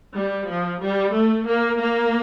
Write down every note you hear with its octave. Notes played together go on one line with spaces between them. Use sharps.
G3
F3
G3
A3
A#3
A#3